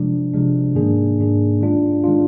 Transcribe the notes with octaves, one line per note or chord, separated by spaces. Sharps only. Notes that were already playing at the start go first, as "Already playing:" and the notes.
Already playing: C3 F3 G#3 D4
C3 F3 G#3 D4
G#2 D#3 A#3 D4 G#4
G#2 D#3 A#3 D4 G#4
D#3 G#3 D4 F4
D#3 G#3 D4 F4